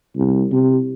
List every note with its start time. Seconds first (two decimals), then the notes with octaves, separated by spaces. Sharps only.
0.17 C2
0.52 C3